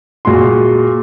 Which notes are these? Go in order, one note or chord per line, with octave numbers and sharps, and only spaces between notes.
A#2 G#3 F#4 C6